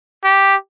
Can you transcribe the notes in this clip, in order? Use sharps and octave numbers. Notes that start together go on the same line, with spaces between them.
G4